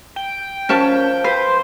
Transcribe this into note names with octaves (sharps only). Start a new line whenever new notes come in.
G5
F3 C#4 A#4 A5
B4 C5